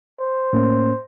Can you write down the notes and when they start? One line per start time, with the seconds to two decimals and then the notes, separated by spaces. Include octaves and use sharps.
0.20 C5
0.53 A2 A#3 C#4